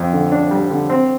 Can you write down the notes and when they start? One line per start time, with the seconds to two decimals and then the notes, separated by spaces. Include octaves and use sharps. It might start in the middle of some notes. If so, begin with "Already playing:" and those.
Already playing: F2
0.13 D3
0.32 D4
0.51 G3
0.70 D3
0.89 C4